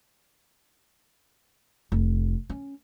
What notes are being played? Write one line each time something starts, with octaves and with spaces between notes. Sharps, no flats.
F1
C#4